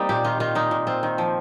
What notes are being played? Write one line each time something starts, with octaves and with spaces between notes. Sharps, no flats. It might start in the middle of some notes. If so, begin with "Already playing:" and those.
Already playing: G3 A#3 C4 D#4
A#2 G4
D#3 F4
D#3 F4
A#2 D#4
A#2
C4 F4
D#3
F3